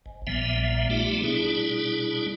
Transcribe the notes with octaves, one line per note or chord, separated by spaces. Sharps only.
G#1
A#1 A#2 F3 G3 B3 E5
G3 A3 B3 D#4 F4 G4
B2 G3 D4 E4 G#4